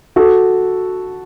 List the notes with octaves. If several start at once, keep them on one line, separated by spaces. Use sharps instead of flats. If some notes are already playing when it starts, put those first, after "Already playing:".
F#4 A4